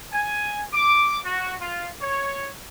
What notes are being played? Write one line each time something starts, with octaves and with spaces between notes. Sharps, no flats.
G#5
D6
F#4
F4
C#5